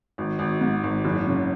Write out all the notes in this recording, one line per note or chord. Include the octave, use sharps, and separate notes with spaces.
G#1
G#1
G#2
G#1
F#1
C#3